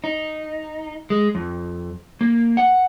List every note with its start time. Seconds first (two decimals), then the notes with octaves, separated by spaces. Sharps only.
0.04 D#4
1.10 G#3
1.35 F2
2.21 A#3
2.57 F#5